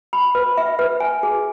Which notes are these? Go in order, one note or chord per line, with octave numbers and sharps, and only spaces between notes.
B5
B4
E5
B4
G#5
G#4